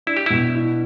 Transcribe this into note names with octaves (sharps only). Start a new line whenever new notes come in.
D4 E4
G4
B2 E4
E4